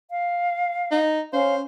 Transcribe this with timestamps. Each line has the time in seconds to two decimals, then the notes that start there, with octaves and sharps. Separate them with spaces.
0.11 F5
0.91 D#4
1.33 C#4 C5 F5